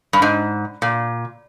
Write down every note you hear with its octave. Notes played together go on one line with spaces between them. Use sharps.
G2
G#2
A#2